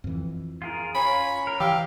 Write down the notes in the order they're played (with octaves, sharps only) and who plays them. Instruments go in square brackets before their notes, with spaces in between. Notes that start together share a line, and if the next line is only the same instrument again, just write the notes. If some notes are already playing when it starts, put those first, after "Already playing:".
[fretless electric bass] F2 E3
[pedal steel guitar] F4 G#4 A#4
[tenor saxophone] C#4 [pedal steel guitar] F4 [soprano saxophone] B5
[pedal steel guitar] A#4
[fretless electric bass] E3 [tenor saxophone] G4 [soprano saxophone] F5 [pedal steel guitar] E6 F6